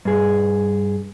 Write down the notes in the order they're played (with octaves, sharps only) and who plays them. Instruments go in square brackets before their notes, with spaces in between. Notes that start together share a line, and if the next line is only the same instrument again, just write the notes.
[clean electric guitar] G2 G#4